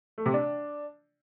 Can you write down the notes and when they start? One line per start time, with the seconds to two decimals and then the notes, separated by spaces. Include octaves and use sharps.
0.18 A3
0.26 C3
0.34 D4